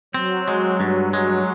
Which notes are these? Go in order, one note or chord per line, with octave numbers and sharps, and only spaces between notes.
F#3 C4
G#3
G2
G#3